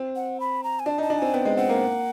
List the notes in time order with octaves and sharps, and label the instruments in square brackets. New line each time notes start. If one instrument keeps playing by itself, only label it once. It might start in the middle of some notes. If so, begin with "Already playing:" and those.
Already playing: [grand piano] C4
[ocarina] F#5
B5
A#5
G#5
[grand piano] D4 [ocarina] A5
[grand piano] D#4 [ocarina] A5
[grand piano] D4
[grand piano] C4 [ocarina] G#5
[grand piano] B3 [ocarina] G5
[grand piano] G#3
[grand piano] C4 [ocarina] F#5
[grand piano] A#3